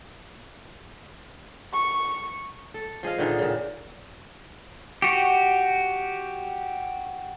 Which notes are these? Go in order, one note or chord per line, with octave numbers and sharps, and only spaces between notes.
C#6
A4
F3 G#4 D#5 F5
A#2 D3 D#3 B3
A#2 C#3
F#4 G4